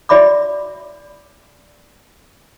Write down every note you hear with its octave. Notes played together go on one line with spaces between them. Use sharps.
F#4 D5 E5 B5 D6